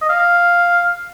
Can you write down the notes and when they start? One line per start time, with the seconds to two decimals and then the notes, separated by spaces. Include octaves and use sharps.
0.02 D#5
0.10 F5